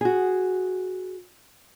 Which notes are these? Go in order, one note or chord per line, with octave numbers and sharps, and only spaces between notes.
F#4 G#4